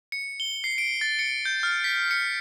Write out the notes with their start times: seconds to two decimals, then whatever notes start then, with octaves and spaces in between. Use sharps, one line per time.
0.12 C#7
0.40 G7
0.64 C7
0.78 D7
1.01 A6
1.19 C#7
1.45 G6
1.63 F6
1.84 B6
2.11 C#7